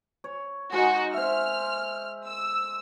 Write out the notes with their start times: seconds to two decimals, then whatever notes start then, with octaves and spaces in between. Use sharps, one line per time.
0.24 C#5
0.72 G#3 D#4 F#4
1.14 C5 E5 F6
2.28 E6